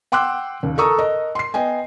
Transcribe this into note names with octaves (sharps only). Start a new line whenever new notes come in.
F#5 G5 C6 D6 E6 F#6
D#2 C#3
A4 A#4 A#5 C#6 D#6 E6
A#4 D#5
C6 C7
B3 D#5 G5 G#5